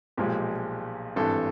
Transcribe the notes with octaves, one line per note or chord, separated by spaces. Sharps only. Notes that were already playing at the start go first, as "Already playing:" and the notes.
B1 A#2 F3 G#3 G4
G#1 G2 E3 A4